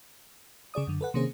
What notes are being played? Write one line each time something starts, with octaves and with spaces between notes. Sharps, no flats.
C#3 G#4 D5 D#6
F#2 D3
A4 B4 F#5
C3 D#3 A#3 C#4 G#4 C5